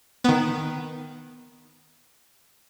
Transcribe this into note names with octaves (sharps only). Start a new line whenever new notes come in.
D#3 B3